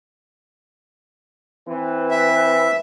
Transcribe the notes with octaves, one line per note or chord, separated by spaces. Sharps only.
E3 C4 B4
E5